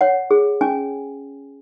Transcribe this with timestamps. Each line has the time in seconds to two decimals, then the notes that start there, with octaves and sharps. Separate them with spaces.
0.01 C#5 F#5
0.31 G#4
0.61 C#4 G#5